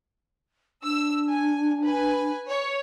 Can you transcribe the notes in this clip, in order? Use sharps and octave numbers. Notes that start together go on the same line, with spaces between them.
D4 E6
G#5
B4 G#5
C#5